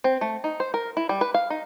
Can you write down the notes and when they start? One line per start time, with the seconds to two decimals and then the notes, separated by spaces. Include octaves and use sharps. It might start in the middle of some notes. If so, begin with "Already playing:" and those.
0.04 C4
0.21 A3
0.44 D#4
0.60 C5
0.74 A#4
0.97 E4
1.09 G3
1.21 B4
1.34 F5
1.50 D#4